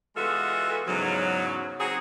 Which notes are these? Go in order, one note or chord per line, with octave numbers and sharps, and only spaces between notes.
E3 G#3 B3 F4 F#4 A4
E2 G#2 C#3 F#3
C4 D#4 F#4 G#4